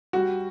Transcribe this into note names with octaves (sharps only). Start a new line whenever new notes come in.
G3 F#4